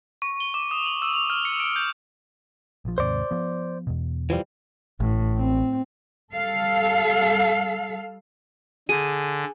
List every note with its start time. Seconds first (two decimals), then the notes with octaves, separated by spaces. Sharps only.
0.22 C#6
0.40 G7
0.54 D6
0.71 D#6
0.86 F#7
1.02 E6
1.13 F7
1.30 F6
1.45 C#7
1.60 D7
1.76 G6
2.85 A#1 F3
2.98 D#2 G#2 C3 C5 D5
3.31 F3 B3
3.87 E2 B2
4.30 E3 F3 G3
5.00 A1 A2
5.38 C4
6.34 G3 A4 F5
8.89 D3 G#4 D#7